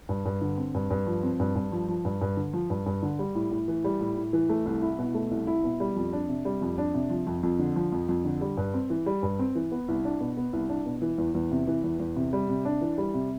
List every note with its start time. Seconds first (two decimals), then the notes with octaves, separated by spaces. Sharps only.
0.09 G2
0.25 G2
0.41 D3
0.58 C4
0.75 G2
0.90 G2
1.07 F3
1.23 C4
1.40 G2
1.55 G2
1.72 F3
1.88 F3
2.05 G2
2.21 G2
2.37 D3
2.53 F3
2.70 G2
2.86 G2
3.03 D3
3.19 G3
3.35 A2
3.51 A2
3.68 E3
3.84 G3
4.01 A2
4.17 A2
4.33 E3
4.49 A3
4.66 C2
4.82 E4
4.99 B2
5.14 A3
5.31 C2
5.47 E4
5.64 B2
5.80 G3
5.96 F2
6.13 D4
6.29 C3
6.45 G3
6.61 F2
6.78 D4
6.94 C3
7.10 F3
7.27 F2
7.43 F2
7.59 D3
7.76 F3
7.92 F2
8.08 F2
8.25 D3
8.41 G3
8.57 G2
8.74 C4
8.90 E3
9.06 G3
9.23 G2
9.39 C4
9.55 E3
9.72 B3
9.88 C2
10.05 D4
10.21 B2
10.37 B3
10.53 C2
10.69 D4
10.86 B2
11.02 E3
11.18 E2
11.35 E2
11.51 C3
11.67 E3
11.84 E2
12.00 E2
12.16 C3
12.33 G3
12.49 C3
12.65 D4
12.81 E3
12.98 G3
13.14 C3